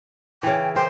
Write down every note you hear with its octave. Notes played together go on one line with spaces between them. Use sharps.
C#3 E3 G5
A#4 C5 G5